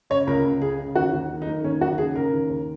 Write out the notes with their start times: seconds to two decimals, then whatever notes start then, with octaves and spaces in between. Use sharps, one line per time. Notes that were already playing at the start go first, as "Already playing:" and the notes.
0.10 C#3 C#5
0.27 C#2 A#4
0.44 C#2
0.61 C#3 G#4
0.78 C#3
0.96 D#2 F#4
1.13 D#2
1.30 D#3
1.42 D#4
1.47 D#3
1.64 D#2 C#4
1.81 D#2 F#4
1.98 C#3 G#4
2.16 C#3 A#4
2.33 D#2
2.50 D#2